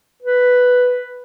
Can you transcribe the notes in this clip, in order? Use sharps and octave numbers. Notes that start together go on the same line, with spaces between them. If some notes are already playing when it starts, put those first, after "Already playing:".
B4